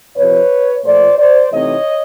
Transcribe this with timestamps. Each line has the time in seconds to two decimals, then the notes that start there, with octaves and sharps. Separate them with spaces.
0.17 F2 C3 F3 B4 C#5
0.85 A#2 F3 A3 C5 D5
1.18 C5 D5
1.52 C3 E3 A3 C4 D#4 C#5 D#5